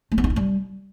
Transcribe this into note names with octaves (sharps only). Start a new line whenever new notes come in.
A3
B3
D#4
E4
G3